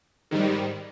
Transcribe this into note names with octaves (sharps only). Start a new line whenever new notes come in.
G#2 D#3 G3